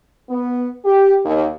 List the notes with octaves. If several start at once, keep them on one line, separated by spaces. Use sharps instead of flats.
B3
G4
D#2